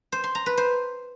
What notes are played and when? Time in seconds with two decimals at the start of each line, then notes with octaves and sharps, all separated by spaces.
0.12 C5
0.24 C6
0.35 A#5
0.46 B4
0.57 C5